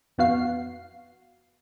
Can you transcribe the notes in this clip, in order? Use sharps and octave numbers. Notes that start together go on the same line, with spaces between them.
F2 B3 F#4 F5 C7